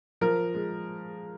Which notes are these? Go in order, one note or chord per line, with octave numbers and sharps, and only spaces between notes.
F3 A#4
G#3